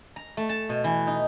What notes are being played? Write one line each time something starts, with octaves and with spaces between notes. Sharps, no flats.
A#5
A3
A5
B2
E3
D#4